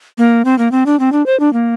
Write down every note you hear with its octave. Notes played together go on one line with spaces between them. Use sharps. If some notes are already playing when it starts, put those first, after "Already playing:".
A#3
C4
A#3
C4
D4
C4
D4
C5
D4
A#3